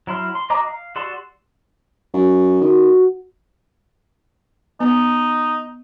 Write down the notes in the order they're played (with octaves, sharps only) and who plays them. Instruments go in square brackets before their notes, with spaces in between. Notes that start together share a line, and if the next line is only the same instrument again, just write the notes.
[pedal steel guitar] F#3 E4 C6 F6
C6
F#4 D#5 A#5 D6 D#6
F5
F#4 G4 D5 C6 E6
[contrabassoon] F#2
[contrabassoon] D#3 [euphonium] F#4
[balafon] B3 [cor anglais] D#4